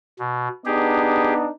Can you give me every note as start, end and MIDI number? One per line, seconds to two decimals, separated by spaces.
0.19 0.49 47
0.66 1.48 59
0.66 1.48 62
0.66 1.48 63
0.66 1.34 67
0.66 1.34 68